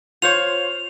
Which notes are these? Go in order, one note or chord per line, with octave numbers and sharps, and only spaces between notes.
F4 C5 C#5 F7